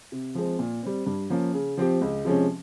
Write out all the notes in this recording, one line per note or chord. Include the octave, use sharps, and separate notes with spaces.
C3
F3 G#3 C4
A#2
G3 C4
G2
F3 A#3 C#4
C#3
F3 C4 G4
C#2
C3 F3 G#3 C#4